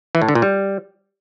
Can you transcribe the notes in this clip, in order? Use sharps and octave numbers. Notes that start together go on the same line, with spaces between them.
E3
A2
D3
A#2
G3